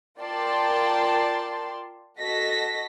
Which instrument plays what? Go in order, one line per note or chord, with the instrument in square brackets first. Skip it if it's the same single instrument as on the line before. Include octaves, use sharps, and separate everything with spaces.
[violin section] F4 A#4 D5 G5 A5 C6
F#4 A4 D#5 A#6 B6